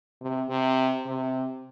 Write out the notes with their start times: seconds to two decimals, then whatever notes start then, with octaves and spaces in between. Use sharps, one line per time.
0.21 C3
0.49 C3
1.06 C3